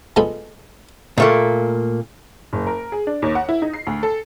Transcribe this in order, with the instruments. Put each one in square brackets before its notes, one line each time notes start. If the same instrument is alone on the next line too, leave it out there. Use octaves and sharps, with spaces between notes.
[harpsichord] F3 G#3 B3 F4 A4 B4
[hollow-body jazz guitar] A#2 A3 A#3
[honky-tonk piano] F#1
A#4
G#4
D4
D#2
F#5
E4
D#4
C7
D2
A4